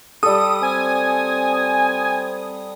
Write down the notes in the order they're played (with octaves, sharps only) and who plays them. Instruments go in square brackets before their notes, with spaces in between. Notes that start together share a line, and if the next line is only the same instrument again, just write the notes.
[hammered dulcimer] G3 A4 [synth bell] D#6
[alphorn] C4 [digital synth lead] G#5